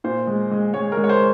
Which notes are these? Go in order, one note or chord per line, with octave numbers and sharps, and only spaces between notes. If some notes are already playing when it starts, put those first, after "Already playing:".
A#2 C5
G#3
G#3
G#3 C#5
A#4
G#3
C#5
C5